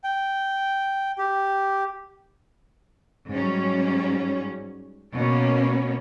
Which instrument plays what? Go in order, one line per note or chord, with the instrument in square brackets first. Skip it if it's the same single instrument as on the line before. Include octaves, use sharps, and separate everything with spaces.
[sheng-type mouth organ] G5
G4
[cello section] G#2 F#3 G3 C#4
B2 A#3 B3 C#4